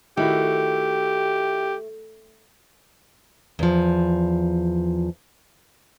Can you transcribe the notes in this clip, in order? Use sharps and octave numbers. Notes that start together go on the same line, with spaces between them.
D#3 A3 E4 F#4 G4
E2 F3